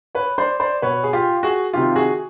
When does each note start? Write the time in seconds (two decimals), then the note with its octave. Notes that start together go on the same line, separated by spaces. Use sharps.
0.15 B4 C#5
0.38 C5 D5
0.60 C5 D5
0.82 B2 B4 C#5
1.04 G#4
1.13 F4 G4
1.43 F#4 G#4
1.73 C3 D#3 F4 G4
1.96 F#4 G#4